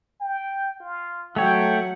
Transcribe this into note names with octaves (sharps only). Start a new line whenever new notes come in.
G5
F4
F#3 A3 C#5 F#5 G5